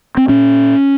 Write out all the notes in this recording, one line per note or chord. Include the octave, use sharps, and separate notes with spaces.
C4
A#2 C#4